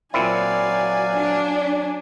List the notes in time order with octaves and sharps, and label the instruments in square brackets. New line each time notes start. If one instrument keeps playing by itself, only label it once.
[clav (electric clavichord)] A#2 C4 E4 [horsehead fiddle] F#3 G#5 [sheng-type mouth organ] D5 F5
[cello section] D4